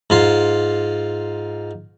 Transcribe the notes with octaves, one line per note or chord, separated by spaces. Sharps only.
G#2 F4 C6